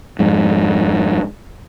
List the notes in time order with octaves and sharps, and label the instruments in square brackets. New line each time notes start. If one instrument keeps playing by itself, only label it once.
[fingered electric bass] F2 G#2